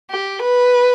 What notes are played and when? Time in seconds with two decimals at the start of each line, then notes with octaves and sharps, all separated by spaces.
0.10 G4
0.42 B4